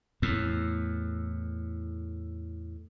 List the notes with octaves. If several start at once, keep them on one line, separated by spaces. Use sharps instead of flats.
E2 A2